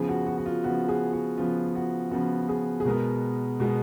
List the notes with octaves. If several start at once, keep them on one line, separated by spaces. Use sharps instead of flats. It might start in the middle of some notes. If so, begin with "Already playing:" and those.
Already playing: C#3 F3 B3 G#4
F#4
F#4
F#4
F4
C#3 F3 B3 F#4
G#4
F#4
C#3 F3 B3 F4
F#4
C#3 F3 B3 F#4
G#4
G#4
B2 G#3 B3 A#4
B2 G#3 B3